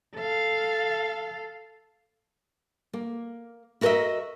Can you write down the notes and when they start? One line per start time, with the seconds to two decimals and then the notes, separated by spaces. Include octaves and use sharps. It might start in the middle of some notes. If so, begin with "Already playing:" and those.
0.16 A4 F5
2.93 A#3
3.81 E4 F#4 A#4 C5 D#5 E5